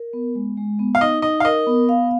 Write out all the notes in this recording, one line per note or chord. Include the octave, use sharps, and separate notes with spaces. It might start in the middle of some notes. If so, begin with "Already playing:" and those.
Already playing: A#4
B3
G#3
G#3
B3
F5
D#4 D#5
D#4 D#5
F5
A#4 D#5
B3
F5